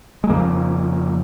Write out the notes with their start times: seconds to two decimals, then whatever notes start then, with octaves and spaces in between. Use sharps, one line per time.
0.24 G#3
0.29 F2 C#3 F3 A#3